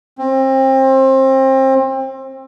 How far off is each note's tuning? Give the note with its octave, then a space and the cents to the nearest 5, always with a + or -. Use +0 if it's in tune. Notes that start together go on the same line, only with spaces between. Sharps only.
C4 +30